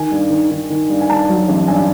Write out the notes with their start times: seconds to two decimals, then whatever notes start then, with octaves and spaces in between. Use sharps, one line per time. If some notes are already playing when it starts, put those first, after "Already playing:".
Already playing: D#3 G#5
0.11 G2
0.30 D#3
0.51 D#3
0.70 D#3
0.90 G2
1.01 G#5
1.10 G2 A5
1.29 F#3
1.49 A1
1.67 G2 G#5